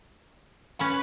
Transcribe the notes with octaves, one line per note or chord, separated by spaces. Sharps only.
C#4 B4 C#5 B5